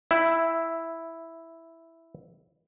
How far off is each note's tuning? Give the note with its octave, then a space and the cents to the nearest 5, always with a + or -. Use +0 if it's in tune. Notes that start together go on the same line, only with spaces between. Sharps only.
E4 +0 E5 +15 G5 +0